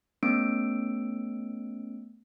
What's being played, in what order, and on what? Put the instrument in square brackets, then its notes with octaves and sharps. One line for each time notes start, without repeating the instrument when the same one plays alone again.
[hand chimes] A3 B3 C#4 E6 D7